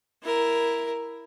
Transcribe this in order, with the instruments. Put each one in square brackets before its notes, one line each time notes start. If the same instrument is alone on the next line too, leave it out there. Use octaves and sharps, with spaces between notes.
[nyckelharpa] E4 A#4